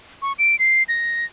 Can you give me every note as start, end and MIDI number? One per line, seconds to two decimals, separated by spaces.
0.22 0.33 85
0.39 0.58 98
0.59 0.83 96
0.89 1.25 94